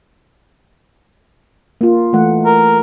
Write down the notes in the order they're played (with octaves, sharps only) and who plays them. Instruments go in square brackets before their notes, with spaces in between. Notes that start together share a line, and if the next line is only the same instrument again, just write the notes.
[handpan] A#3 F4
E3 A3 F#5
[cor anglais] A#4